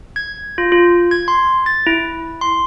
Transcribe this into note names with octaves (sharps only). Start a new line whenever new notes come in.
G#6
F4
F4
G#6
C6
A6
E4
C6